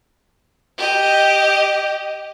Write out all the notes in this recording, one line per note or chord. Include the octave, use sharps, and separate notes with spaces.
G4 D#5